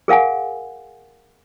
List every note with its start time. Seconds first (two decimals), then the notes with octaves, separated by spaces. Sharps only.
0.08 G#4 A#4 F5 F#5 G#5